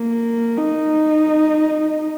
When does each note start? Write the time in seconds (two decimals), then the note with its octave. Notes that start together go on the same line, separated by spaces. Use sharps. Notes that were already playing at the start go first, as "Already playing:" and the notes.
Already playing: A#3
0.57 D#4